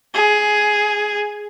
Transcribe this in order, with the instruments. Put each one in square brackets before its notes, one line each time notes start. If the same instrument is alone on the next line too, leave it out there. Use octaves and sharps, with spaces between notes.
[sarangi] G#4